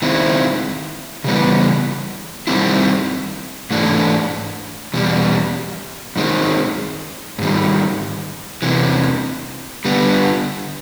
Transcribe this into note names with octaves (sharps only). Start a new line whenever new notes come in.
D#3 G#3 C4 E4
C#3 E3 G3 B3
F#2 D#3 G3 C4 E4
G#2 E3 A3 D4
E2 B2 G3
F#2 D#3 G#3 C4
G#2 D#3 G3
E2 C3 E3
D3 G3 B3